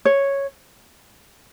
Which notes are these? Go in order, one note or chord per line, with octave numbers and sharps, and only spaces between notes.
C#5